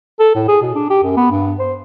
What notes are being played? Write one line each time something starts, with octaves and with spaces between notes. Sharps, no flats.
A4
A2
G#4
B2
D4
G4
F#2
B3
G2
C5